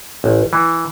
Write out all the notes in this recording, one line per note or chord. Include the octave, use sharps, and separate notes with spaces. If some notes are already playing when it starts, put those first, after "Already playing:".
A1
E3